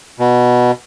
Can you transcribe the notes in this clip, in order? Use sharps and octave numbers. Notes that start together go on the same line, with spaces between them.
B2